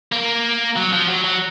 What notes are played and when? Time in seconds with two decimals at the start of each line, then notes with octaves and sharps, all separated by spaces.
0.12 A#3
0.76 F#3
0.92 F3
1.08 F#3
1.24 F#3